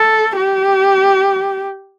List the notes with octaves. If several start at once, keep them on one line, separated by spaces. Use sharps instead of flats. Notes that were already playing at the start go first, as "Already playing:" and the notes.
Already playing: A4
G4